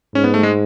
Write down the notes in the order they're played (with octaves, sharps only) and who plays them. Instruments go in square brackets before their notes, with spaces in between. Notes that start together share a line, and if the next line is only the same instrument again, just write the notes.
[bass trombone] G#2 [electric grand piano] C#4
[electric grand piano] B3
A3
G#3